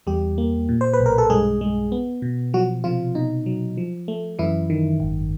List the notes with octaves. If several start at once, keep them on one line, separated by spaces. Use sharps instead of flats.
E2 G3 G4
A#3
A#2
C5
B4
B1
A#4
A4
G2 G#3 G#4
G#3
B3
B2
F3 F#3 F#4
C3 F3 F4
B2 D#4
F#3
F3
A3
F#2 E3 E4
D#3
G#1